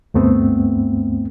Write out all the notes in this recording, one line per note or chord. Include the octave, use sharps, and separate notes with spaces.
D2 G2 A3 B3 C4